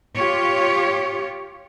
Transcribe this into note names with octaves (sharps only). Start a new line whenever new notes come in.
F4 G4 C#5